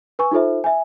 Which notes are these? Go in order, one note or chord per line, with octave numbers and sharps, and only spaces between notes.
B4 G#5 C#6
D#4 F4 A4 C5 E5
E5 G#5